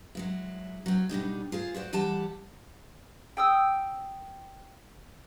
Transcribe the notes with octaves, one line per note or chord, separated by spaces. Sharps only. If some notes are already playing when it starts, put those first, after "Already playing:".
F#3 G#3 E4
F#3 C4
B2 G3 D4 D#4
F4 G#4 C5
E4 F#4 C5 D5
E3 G3 G4 F#5 A5
G5 D#6 E6